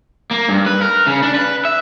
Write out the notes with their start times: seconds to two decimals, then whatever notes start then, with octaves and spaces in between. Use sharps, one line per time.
0.31 A#3
0.49 G2
0.66 B4
0.82 A#4
1.07 C#3
1.23 D4
1.34 B4
1.65 E5